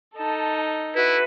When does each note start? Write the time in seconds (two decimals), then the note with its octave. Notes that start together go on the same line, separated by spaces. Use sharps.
0.16 D#4 A4 A5
0.96 E4 F#4 B4 E5